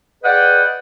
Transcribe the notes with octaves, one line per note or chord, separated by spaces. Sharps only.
G#4 B4 D5 D#5 F#5 G5